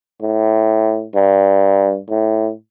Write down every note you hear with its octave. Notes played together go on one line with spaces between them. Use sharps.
A2
G2
A2